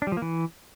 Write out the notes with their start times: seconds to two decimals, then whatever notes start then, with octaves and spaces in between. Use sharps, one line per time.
0.02 D4
0.07 G3
0.12 F3
0.17 A#3
0.22 E3